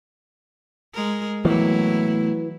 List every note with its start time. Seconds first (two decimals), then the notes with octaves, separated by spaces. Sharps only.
0.94 G#3 A#4
1.45 E2 A2 E3 F#3 A#3 E4